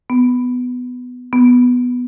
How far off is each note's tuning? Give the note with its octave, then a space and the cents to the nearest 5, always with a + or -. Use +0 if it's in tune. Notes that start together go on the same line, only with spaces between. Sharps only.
B3 +10
B3 +0